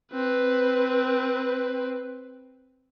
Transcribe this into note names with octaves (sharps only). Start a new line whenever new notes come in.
C4 B4